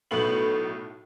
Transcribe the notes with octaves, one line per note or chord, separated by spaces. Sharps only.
B1 A2 A3 B3 B5 F#7